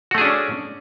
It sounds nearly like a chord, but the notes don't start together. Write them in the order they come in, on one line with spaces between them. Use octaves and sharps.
F#4 A3 G#4 D4 C#4